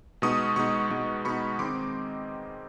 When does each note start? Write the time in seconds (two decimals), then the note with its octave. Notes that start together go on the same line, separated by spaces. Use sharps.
0.22 B2 G#3 B3 D#4 C#6 D#6
0.56 B2 G#3 B3 D#4 C#6 D#6
0.91 B2 G#3 B3 D#4
1.25 B2 G#3 B3 D#4 B5 C#6
1.59 D#3 G#3 C4 D#4 C6 D6